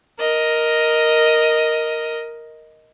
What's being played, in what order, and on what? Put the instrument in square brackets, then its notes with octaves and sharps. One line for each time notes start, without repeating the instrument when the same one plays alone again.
[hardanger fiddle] A#4 D#5